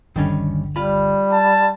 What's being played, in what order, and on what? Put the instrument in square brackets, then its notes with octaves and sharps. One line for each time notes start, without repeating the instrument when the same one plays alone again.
[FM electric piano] G1 D#2 D3 [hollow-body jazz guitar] D#3 G3 C#4
[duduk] G3 [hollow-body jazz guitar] F4 B5
[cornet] A5